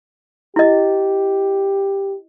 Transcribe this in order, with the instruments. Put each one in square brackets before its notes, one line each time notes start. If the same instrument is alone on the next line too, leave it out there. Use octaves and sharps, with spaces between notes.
[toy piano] E4 D#5 [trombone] G4